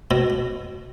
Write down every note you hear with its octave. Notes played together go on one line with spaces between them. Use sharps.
B2